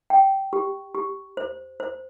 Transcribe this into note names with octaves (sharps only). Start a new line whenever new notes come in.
G5
G4
G4
C5
C5